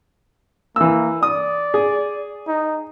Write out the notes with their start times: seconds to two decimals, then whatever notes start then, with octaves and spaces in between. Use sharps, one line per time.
0.76 E3 A#3 E6
1.23 D5 D#6
1.74 G#4
2.48 D#4